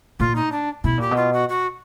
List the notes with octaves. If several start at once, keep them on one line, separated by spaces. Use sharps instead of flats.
A#2 F4
D#4
D4
B2 E4
A#2 G4
B2
F4
F#4
F#4